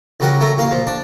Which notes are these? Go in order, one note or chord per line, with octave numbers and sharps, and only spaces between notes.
C#2 C#3 F#3 G3 A#4 F#5
F#3 A3 A4 A#5
A1 A#3 A#4 F5
A#2 F3
D4 D5 A5